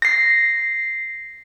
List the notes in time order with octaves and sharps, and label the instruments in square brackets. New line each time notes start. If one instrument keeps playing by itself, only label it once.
[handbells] A#6 C7